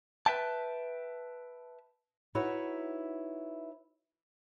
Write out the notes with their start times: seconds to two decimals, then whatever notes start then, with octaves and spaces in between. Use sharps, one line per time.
0.26 B4 C5 E5 G5 A5
2.35 D#4 E4 F#4 B4 C#5 E5